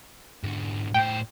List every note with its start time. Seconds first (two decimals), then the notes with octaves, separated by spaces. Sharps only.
0.44 G#2 D3
0.94 A2 C5 G5